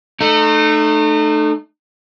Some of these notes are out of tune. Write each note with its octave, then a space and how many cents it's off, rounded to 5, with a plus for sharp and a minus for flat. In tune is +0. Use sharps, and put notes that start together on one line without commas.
A3 -5 D#4 -35